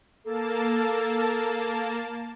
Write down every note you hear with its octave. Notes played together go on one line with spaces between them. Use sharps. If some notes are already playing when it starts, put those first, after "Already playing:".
A#3 A4 A5